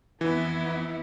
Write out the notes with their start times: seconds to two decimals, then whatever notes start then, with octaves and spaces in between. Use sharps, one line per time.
0.21 F2 E3 B3 E4